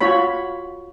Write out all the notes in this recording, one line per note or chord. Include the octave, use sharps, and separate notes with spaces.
F4 F#4 C#5 B5